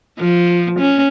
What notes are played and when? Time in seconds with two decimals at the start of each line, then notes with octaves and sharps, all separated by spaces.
0.19 F3
0.80 C#4